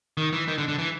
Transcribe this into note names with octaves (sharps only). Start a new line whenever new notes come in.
D#3
E3
D#3
D3
D3
E3